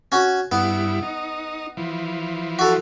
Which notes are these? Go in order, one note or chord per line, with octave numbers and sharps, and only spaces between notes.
C#4 F#4
G2 B3 E4
D#4
E3 F3
F#4 A4